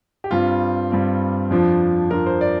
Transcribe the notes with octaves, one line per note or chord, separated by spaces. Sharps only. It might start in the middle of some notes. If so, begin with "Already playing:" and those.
G4
G2 G3 C4 F4
G2 G3 C4 F4
F2 F3 D4 F4
F2 F3 D4 F4 A#4
C5
D5